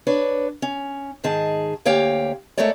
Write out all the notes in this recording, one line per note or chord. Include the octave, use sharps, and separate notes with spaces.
D4 B4 C#5
C#4
G#2 D#3 G#4 A5
D2 A#3 G4 C#5 F5 G5
G#3 A3 A4 A#4 C#5 D5